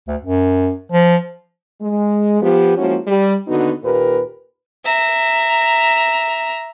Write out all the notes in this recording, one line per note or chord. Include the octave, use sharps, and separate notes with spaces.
D2
F#2
F3
G#3
F3 B3 G4
F3 G#3 A#3 C#4 E4 F#4
G3
D#2 D3 B3 D#4 F#4
D#2 A#2 G4 A#4 B4
E5 A#5